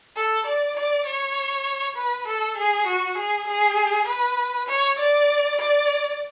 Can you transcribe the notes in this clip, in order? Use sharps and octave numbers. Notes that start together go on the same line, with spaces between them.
A4
D5
D5
C#5
B4
A4
G#4
F#4
G#4
G#4
B4
C#5
D5
D5